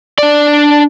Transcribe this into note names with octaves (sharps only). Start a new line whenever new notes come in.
D4 D5